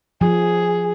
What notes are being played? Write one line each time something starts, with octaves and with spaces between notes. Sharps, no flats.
F3 G#4